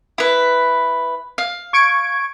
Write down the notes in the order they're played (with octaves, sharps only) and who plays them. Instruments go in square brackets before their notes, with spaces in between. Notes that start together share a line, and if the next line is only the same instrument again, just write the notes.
[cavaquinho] E4 B4
F5
[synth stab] C#6 G#6 D7